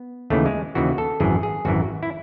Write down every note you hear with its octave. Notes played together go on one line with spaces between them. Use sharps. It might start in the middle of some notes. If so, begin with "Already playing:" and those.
Already playing: B3
D#2 C#3 E3 A3
G#3
D#2 C#3 E3 F#4
A4
G#1 F#2 E3 G#4
G#4
G#1 F#2 E3 F#4
E4